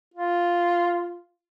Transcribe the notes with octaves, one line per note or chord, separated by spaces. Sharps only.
F4